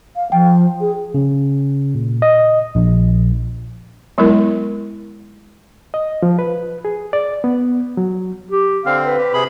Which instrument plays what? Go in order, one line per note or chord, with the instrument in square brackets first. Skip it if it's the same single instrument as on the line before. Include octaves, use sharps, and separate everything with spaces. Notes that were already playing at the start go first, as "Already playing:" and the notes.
[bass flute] F5
[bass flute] F3 [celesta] G5
[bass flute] G#4
[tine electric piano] C#3
A#2
D#5
A#1
[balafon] F#3 G#3 B3 E4 A#4
[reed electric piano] D#5
F3
B4
G#4
D5
B3
F#3
[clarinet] G4
[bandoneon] D3 C4 [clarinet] F5
[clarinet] B4
[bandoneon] G4
C3 G#4 B5